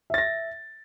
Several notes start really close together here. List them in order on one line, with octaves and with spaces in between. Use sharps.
E5 A6 A#6